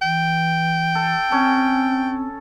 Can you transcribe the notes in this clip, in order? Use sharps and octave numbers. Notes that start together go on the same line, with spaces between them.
E3 G5
A4
C4 C#4 A4 G#5